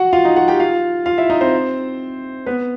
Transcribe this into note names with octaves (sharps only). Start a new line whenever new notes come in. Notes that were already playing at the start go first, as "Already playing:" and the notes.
Already playing: F#4 F#5
F4 F5
D#4 D#5
F#4 F#5
G4 G5
F4 F5
F4 F5
E4 E5
D#4 D#5
C4 C5
B3 B4